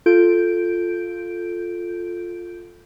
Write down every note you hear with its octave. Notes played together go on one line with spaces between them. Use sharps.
F4 A4 G6 D7